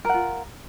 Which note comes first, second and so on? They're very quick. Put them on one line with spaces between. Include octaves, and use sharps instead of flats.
A#4 F#5 F4